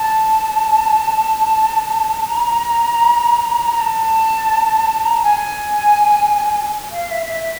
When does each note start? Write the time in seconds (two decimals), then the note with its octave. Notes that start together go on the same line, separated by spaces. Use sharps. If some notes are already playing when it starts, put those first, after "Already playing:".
Already playing: A5
2.26 A#5
3.74 A#5
3.79 A5
5.05 A#5
5.15 A5
5.23 G#5
6.91 F5
7.10 E5
7.29 E5